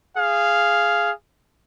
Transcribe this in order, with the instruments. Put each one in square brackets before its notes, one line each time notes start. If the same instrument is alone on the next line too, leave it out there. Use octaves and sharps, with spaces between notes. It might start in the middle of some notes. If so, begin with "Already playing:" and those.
[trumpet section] G#4 F5